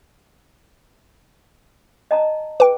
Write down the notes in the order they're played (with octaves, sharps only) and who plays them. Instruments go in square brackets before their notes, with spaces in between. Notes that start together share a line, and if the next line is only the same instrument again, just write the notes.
[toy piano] D#5 A5 A#5
[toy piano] G#4 [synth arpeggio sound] B4 G5